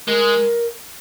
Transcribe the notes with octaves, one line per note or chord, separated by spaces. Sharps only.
G#3 A#4